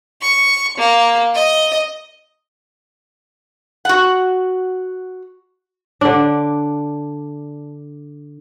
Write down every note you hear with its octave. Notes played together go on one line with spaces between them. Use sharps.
C#6
A#3
D#5
F#4 F#5
D3 D4